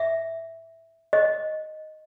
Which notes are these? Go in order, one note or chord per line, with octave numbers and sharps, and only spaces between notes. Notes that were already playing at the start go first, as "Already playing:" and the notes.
Already playing: E5
D#5